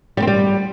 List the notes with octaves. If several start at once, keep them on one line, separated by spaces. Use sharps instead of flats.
G3
C4
G3